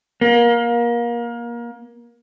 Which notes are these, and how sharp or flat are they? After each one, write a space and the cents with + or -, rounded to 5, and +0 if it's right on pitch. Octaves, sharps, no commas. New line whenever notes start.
A#3 +25